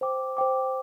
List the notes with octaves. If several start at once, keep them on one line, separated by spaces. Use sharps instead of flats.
C5 G5 D6
C5 G5 D6